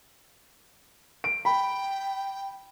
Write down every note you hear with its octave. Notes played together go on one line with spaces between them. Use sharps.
D7
G5 B5